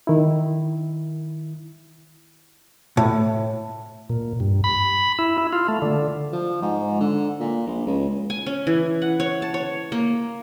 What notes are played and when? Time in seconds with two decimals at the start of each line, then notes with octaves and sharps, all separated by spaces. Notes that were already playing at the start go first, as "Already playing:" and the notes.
0.07 D#3 E4
2.97 A2
4.10 A#2
4.40 G2
4.64 B5
5.19 E4
5.38 E4
5.53 F4
5.68 A3
5.82 D3
6.33 F3
6.62 G#2
7.00 D3
7.40 A#2
7.67 A#1
7.87 C#2
8.30 G#5
8.46 C#4
8.67 E3
9.02 F#5
9.20 C#5
9.42 A5
9.54 C#5
9.92 A#3